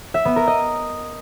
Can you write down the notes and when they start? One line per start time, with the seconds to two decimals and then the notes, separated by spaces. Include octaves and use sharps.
0.14 E5
0.25 B3
0.36 A#4
0.47 D#5